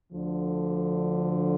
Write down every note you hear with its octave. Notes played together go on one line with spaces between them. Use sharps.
D2 D3 F3